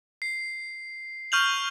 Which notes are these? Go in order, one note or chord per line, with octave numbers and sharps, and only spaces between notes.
C7
C#6 F6 G6 F7 F#7